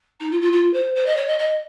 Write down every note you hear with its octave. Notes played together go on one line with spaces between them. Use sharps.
D#4
F4
F4
F4
C5
C5
D#5
C#5
D#5
D#5